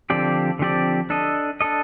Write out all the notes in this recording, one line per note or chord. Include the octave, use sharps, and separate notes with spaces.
D3 F3 C4 G4 D5
D3 F3 C4 G4 D5
D4 A4 D#5
D4 A4 D#5